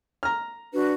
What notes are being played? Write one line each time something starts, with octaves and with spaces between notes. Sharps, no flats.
A#5 F6
D4 F#4 B4